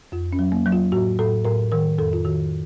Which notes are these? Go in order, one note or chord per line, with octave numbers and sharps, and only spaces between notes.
F2 F4
C#4
F#3
A#3
F#3
F4
A2 F#4
A2 A4
A2 A#4
D#3 A#4
F2 A4
F4
D#3 F#4